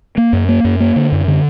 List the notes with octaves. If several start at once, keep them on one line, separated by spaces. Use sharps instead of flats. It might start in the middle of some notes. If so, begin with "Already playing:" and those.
A#3
F#2
A#3
F#2
A#3
D3
F#2
D3